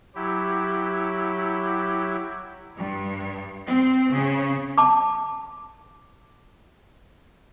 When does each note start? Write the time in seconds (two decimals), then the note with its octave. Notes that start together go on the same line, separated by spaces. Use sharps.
0.15 F#3 E4 G4
2.76 G2
3.66 C4
4.11 C#3
4.78 A5 D6